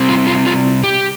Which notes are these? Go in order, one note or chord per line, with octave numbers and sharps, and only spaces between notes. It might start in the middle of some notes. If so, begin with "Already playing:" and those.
Already playing: C3 G3 C4
F4
F4
F4
G4